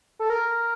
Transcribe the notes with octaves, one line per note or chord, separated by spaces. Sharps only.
A4
A#4